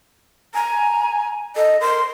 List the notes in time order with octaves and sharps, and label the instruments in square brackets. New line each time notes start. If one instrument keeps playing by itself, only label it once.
[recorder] G#5 [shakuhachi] A#5
[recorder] A4 [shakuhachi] D#5
[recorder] A#4 [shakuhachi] C6